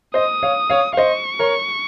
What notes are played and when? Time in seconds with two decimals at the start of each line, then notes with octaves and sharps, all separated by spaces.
0.14 C5 D#5 D#6
0.43 C#5 F5
0.70 C#5 F5
0.93 F5
0.97 C5 D#5 C#6
1.39 A#4 C#5